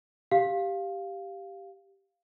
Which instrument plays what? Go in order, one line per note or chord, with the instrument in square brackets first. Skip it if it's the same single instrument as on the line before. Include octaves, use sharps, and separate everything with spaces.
[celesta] G4 F5